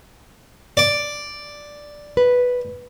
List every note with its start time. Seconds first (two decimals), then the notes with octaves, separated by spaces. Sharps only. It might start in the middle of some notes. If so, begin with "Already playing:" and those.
0.77 D5
2.17 B4